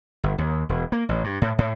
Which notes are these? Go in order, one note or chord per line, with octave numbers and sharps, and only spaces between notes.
G1
D#2
E1
A#3
A1
G2
A2
A2